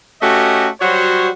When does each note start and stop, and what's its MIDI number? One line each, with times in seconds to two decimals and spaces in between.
0.21 0.68 57
0.21 0.68 61
0.21 0.68 66
0.21 0.68 67
0.21 0.68 75
0.81 1.28 54
0.81 1.28 55
0.81 1.28 66
0.81 1.28 72
0.81 1.28 73